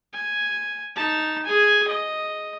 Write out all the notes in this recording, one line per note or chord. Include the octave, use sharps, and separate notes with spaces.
G#5
D#4 A5
G#4 G#5
D#5